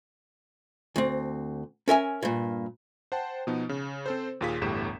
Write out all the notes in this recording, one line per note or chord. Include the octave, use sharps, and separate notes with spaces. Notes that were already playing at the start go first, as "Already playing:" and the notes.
D2 C4
C#4 A#4 E5 G#5
G2 A#2
C5 F#5 G5 A5
B2 F3 B3 D#4
C#3
C4 A4 C5
D#2 A#2 F4 G#4 B6
G1 E2 A2 G4 E7